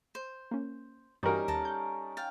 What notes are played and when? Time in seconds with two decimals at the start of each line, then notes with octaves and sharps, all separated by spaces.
0.15 C5
0.51 A#3 C#4
1.23 G2 E3 G3 C#4 D#4 F#4 A#4
1.48 D#2 A4 A5 A#5
1.65 G6
2.17 F5 G5 A6